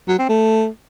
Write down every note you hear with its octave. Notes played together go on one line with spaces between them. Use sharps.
F#3
C4
A3